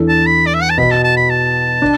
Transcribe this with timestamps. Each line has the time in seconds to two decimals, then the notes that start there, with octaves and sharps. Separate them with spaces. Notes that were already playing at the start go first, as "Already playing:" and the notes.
Already playing: E2 E3 D4 A4
0.09 A5
0.26 B5
0.47 D5
0.54 E5
0.62 F#5
0.70 A5
0.78 B2 B3 F#4 B5
0.91 A5
1.04 A5
1.17 B5
1.30 A5
1.82 D4